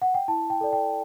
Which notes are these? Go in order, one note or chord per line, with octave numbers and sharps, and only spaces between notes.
F#5
G5
E4 A5
G5
A4 D5
G5